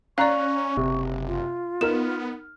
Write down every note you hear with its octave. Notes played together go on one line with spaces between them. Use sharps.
C#4 D5 F5 A#5 C#6 F#6
F#1 C3
F4
B3 D#4 A#4 F6 E7